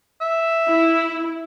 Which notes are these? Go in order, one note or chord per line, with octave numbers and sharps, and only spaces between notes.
E5
E4